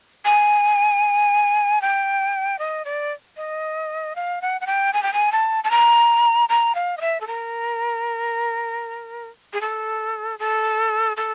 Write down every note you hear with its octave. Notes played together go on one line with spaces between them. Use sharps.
G#5
G5
D#5
D5
D#5
F5
F#5
F#5
G5
G#5
G5
G#5
A5
A5
A#5
A#5
F5
D#5
E5
A4
A#4
G#4
A4
A4
A4